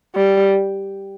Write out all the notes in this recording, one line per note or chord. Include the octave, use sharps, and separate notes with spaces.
G3